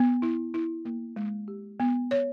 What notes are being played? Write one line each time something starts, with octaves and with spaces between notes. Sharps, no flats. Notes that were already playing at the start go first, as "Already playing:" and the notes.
Already playing: B3
E4
E4
A#3
G#3
G4
B3
C#5